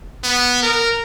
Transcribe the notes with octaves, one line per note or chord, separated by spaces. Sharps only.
B3
A#4